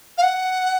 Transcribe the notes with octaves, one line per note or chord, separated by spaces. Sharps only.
F5
F#5